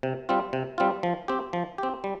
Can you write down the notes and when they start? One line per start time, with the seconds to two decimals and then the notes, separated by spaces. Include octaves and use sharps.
0.03 C3
0.29 G3 C4 F4
0.53 C3
0.78 G3 C4 F4
1.03 F3
1.28 C4 G4
1.53 F3
1.78 C4 G4
2.04 G3